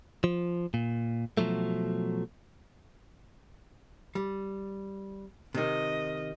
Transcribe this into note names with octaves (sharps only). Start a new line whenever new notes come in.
F3
A#2
B2 F3 F#3 A3
G3
C3 D#3 D#5